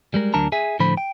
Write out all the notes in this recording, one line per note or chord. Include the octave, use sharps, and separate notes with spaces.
G3 G#3 A#4
D2 F#3 D4 A#4 A5 A#5
G#4 E5 G#5
A2 D3 F3 C5 B5
G5